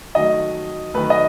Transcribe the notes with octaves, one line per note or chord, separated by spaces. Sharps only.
D#3 F#3 A3 D#5
D#3 F#3 A3 B4
D#5